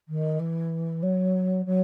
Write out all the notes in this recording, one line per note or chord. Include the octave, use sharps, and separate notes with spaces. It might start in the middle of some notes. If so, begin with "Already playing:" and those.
D#3
E3
F#3
F#3